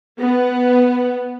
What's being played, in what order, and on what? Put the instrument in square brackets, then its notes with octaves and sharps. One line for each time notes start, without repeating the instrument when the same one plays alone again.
[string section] B3